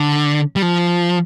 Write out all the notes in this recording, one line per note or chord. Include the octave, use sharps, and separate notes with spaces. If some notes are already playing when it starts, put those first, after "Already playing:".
Already playing: D3
G3
F3